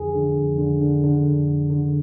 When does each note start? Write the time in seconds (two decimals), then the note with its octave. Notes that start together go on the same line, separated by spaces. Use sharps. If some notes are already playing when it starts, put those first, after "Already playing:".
Already playing: F2 D3 G#4
0.15 D3
0.37 F2
0.58 D3
0.81 D3
1.04 D3
1.26 F2
1.48 D3
1.70 D3